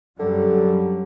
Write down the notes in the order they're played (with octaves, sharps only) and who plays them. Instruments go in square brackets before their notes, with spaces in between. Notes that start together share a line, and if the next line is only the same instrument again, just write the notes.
[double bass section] F#2 F#3 G3 [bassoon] D3